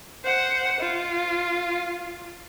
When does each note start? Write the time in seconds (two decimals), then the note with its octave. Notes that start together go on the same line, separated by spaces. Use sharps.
0.25 C5 F#5
0.81 F4